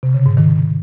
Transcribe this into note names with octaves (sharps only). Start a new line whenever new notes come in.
C3
C#3
G#2
D#3